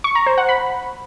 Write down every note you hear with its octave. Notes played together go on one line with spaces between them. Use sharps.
C#6
A#5
C5
F#5
B5